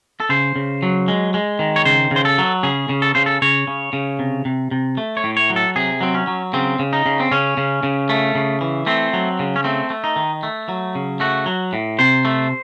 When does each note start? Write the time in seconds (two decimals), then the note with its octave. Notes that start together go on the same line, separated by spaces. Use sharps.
0.20 A4
0.29 C#3 C5
0.56 C#3
0.83 F#3
1.08 G#3
1.34 G#3
1.59 D#3
1.76 C#5
1.85 C#3 C5
2.11 C#3 C5
2.25 A4
2.38 F#3
2.63 C#3 G#4
2.89 C#3
3.02 A4
3.15 C#3 C5
3.26 A4
3.42 C#3 C#5
3.67 C#3
3.93 C#3
4.19 C3
4.45 C3
4.71 C3
4.97 A3
5.17 C#5
5.24 A2
5.37 C#5
5.50 F#3
5.56 A4
5.76 C3 G#4
6.01 F#3 C4
6.14 C#4
6.27 F#3
6.53 C#3 C4
6.79 C#3
6.93 D#4
7.06 C#3
7.20 C4
7.31 C#3 C#4
7.57 C#3
7.83 C#3
8.09 A3
8.35 C#3
8.61 E3
8.87 A3 C4
9.13 F#3
9.39 C#3
9.56 C#4
9.64 A3 C4
9.90 A3
10.04 D#4
10.16 D#3
10.43 A3
10.69 F#3
10.95 C#3
11.20 A3 F#4
11.46 F#3
11.73 A2
11.99 C3 C5
12.25 A3